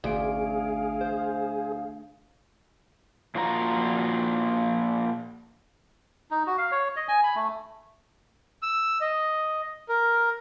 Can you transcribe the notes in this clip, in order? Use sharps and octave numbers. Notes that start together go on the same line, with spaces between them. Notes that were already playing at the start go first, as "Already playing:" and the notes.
A1 D2 G#4 F5 D7
C5
A#2 F3 F4 F#4 A4 A#5
D#4
F#4
F5
C#5
D#5
G#5
B5
A3
E6
D#5
A#4